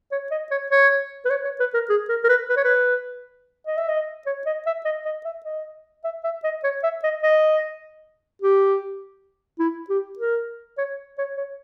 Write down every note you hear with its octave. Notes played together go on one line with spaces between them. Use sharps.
C#5
D#5
C#5
C#5
B4
C#5
C#5
B4
A#4
G#4
A#4
A#4
B4
B4
C#5
B4
D#5
E5
D#5
C#5
D#5
E5
D#5
D#5
E5
D#5
E5
E5
D#5
C#5
E5
D#5
D#5
G4
E4
G4
A#4
C#5
C#5
C#5